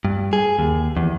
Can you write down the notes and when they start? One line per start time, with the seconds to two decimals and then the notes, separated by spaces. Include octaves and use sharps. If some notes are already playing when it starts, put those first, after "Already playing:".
0.05 G2
0.33 G#4
0.59 D#2
0.97 E2